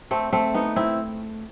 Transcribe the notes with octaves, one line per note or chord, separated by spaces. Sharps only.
A3 C4
A3 C4
B3 D#4
C4 E4